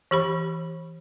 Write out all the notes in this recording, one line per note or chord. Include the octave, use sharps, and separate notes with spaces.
E3 G4 B5